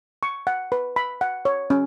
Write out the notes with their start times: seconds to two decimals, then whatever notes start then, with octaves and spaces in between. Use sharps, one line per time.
0.23 C#6
0.47 F#5
0.72 B4
0.96 B5
1.21 F#5
1.45 C#5
1.70 C#4